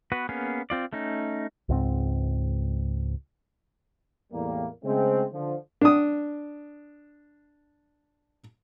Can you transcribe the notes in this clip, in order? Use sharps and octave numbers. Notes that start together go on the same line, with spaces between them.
B3 F#4 B4
A#3 B3 C#4 G#4
C4 F4 D5
A3 C#4 D#4
C#2 G#2 C4
E2 A2 G3 A#3
C#3 G#3 A3 C4
D3 F3
D4 D#6